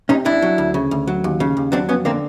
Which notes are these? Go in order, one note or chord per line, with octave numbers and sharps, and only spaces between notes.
C3 C#4 D#4
C2 D4 E4
F#3
D2
C#3
D2
F#3
D#2
C#3
D#2
F#3 C4 D4
F2 B3 C#4
D3 A#3 C4